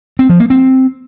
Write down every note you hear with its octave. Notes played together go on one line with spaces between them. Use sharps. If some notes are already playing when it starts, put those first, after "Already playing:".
C4
F3
A#3
C4